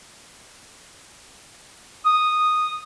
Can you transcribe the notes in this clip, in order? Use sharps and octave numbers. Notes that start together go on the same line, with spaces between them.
D#6